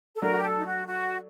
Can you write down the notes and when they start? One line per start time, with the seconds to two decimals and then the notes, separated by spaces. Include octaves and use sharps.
0.16 A4
0.22 F#3 A3 D4 A#4
0.30 F#4
0.37 G4
0.43 A4
0.57 D#4
0.66 F#4
0.87 F#4